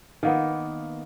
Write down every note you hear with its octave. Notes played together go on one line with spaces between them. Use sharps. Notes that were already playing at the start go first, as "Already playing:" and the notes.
D#3 A#3 B3